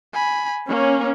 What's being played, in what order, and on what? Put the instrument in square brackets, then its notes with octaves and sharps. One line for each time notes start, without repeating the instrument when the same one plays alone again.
[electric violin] G#5 B5
[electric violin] A#3 [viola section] C#4